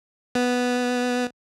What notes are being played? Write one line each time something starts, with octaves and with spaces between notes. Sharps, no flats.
B3